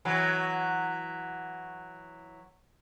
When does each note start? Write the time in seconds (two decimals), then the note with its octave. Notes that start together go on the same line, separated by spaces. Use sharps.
0.05 E3 F#3